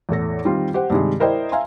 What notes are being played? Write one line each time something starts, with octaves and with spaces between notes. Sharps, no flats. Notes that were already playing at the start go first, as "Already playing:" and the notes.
E2 A2 A4 A#6
D#3 G3 C4 F4
G4 C5 F#5
G2 C3 D#3 G#3
E4 A#4 C5 D5 D#5 G5
E5 F5 G#5 A#5 C6